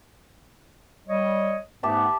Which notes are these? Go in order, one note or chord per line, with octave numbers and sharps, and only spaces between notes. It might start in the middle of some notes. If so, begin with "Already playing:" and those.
G3 C#5 D#5
G#2 A3 B3 G4 E5 A5